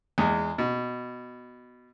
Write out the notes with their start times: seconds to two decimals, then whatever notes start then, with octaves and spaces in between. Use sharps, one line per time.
0.18 E2 G#3
0.58 B2